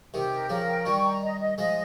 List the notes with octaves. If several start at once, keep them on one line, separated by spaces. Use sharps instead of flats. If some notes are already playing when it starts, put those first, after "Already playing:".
C3 D#3 G4
A#4
C#3 F3 A#4
G5
D#3 G3 C#6
A#5
D#5
D#5
F3 G#3 D#5